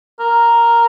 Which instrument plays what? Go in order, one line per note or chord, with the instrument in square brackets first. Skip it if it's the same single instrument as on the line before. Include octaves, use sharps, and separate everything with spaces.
[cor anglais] A#4